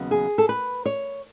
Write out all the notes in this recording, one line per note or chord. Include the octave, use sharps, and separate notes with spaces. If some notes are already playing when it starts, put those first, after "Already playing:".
Already playing: D#2 C#3 F#3 B3
G#4
A4
B4
C#5